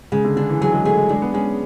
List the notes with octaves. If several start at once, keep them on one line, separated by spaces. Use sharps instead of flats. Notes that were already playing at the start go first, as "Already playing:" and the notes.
C#3 G#3
D3
D3 D4
E3
F#3 G#4
G#3
A3 G#4
G#3
G#3 D4
B3
G#3 C#4